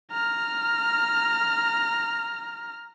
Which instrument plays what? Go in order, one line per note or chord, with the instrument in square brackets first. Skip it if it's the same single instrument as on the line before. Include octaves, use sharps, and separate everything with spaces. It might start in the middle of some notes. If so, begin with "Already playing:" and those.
[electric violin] A#5 F6